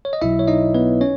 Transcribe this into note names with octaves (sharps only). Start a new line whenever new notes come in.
C#5
D#5
B1 B2 F#3 E4 E5
C#5
D#4 D#5
B3 B4
C#4 C#5